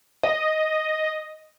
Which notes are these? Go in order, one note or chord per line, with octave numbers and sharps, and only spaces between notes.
D#5